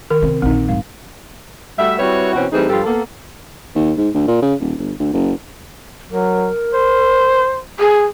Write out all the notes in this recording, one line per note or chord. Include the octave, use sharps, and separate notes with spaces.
D#3 A#4
C3 C4
A#1 D3 C4 D#4
G#2 G3 F5
G3 A3 F#4 E5
G3 C4 E4 F#4 B4 C#5
B2 E3 C4 C#4 F#4
E3 G3 A3 C4 D#4 G#4
G2 F3 G3 F4 G4 A4
A#3 B3 A4
D#2
G#2
D2
A#2
C#3
D#1
G1
D2
F#1
F#3 A#4
C5
G#4